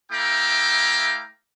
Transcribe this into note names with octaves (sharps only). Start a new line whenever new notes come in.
A3 E4 F5 G5 A#5 D6